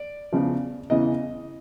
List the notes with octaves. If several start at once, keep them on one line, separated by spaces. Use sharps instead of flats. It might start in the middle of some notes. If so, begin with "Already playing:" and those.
Already playing: D5
E2 C#3 F3
E2 C#3 E3 D#5